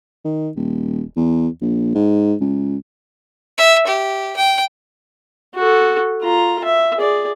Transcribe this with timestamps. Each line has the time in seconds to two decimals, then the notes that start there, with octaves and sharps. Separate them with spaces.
0.25 D#3
0.56 D#1
1.17 E2
1.61 A#1
1.95 G#2
2.41 C#2
3.58 E5
3.87 G4
4.36 G5
5.55 F#4 A4
6.22 F4 A#5
6.65 E5
6.97 G#4 D5